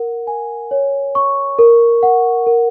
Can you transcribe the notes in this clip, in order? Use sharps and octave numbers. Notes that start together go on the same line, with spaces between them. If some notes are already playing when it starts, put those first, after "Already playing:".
Already playing: A#4 F#5
G#5
C#5
C#6
A#4
F#5
A#4